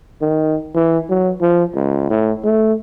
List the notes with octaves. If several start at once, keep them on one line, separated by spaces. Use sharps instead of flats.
D#3
E3
F#3
F3
C#2
A2
A3